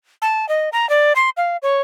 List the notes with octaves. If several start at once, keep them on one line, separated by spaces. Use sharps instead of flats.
A5
D#5
A#5
D5
C6
F5
C#5